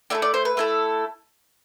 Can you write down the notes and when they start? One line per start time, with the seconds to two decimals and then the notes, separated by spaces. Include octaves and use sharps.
0.10 A3 E4 A4 D5
0.22 D5
0.34 C5
0.45 B4
0.57 A3 E4 A4